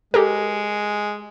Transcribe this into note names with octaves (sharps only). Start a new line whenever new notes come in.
G#3 G4 A4 A#4